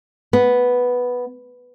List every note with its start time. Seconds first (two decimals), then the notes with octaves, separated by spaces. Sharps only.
0.33 B3